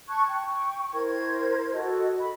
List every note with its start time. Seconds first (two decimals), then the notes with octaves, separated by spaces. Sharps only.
0.08 A5 C#6 F#6 G#6
0.28 G5 C#6
0.93 E4 A#4 C5 G#6
1.73 F#4 A4 D#5
2.17 B5